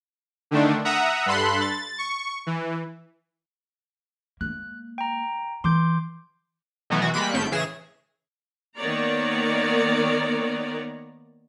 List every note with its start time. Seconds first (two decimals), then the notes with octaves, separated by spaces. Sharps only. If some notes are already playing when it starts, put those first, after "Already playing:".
0.51 D3 D#3 A3 D4
0.85 E5 F#5 A#5 D#6
1.26 G2 A4 B5 C6 F#6
1.61 A6
1.98 C#6
2.46 E3
4.41 G#3 A#3 F#6
4.98 G5 A#5
5.64 E3 C6 D6 G6
6.90 B2 D#3 E3 F#3 A3 B3
7.02 B2 E3 F#4
7.14 G3 G#3 A#3 B5 F#6
7.34 G#1 A2 A3 G6 D7
7.52 C#3 E3 G#4 A#6 E7
8.77 D#3 A#3 B3 C#5 D5 A#5